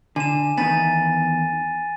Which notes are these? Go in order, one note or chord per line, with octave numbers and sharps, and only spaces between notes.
D3 G#5 E7
E2 D#3 B3 G#5 A6 D#7